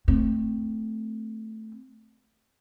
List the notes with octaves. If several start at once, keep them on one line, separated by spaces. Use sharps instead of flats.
A3 C4